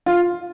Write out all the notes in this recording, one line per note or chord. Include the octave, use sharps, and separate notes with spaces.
F4